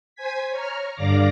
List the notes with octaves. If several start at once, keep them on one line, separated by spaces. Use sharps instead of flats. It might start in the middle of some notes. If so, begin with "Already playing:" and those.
C5 G#5 G#6 B6
C#5 A#5 F6
G2 D3 D5 F5 D6 A#6